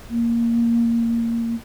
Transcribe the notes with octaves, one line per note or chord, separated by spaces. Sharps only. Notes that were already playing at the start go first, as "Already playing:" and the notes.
A#3